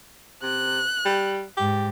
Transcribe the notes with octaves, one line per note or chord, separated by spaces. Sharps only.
C3 F#6
G3
G#2 G4